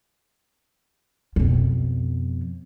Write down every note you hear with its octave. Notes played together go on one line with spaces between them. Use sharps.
F2 B2